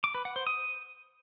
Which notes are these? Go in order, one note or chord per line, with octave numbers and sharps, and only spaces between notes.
D6
B4
F#5
C5
D#6